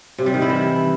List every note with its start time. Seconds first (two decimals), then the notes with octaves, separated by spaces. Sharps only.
0.18 C3
0.26 G3
0.34 D#3
0.42 E4
0.49 E3